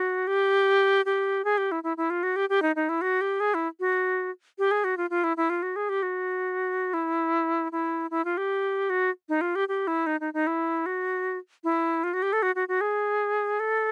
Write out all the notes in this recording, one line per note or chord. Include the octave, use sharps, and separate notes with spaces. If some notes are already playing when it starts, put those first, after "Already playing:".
Already playing: F#4
G4
G4
G#4
G4
E4
E4
E4
F4
F#4
G4
G4
D#4
D#4
E4
F#4
G4
G#4
E4
F#4
G4
G#4
F#4
F4
F4
E4
E4
F4
F#4
G#4
G4
F#4
E4
E4
E4
F4
G4
F#4
D#4
F4
G4
G4
E4
D#4
D#4
D#4
E4
F#4
E4
F4
F#4
G4
A4
F#4
F#4
F#4
G#4
A4